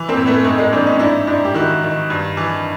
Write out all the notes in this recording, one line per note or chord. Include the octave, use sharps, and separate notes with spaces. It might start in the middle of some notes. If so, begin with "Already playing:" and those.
Already playing: E3
A#3 C4
A2
A3 B3
G#2 A3
G#3 A#3
E3 C4 D4
C#4 D#4
G#2 D4 E4
G#2 D4 E4
G4
D#3 E4 F#4
D#3
G2
E3